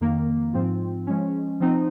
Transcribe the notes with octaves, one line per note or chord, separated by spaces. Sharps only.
F2 D#3 A#3
G#2 F3 C4 F4
F3 G#3 C#4
F3 C4 D#4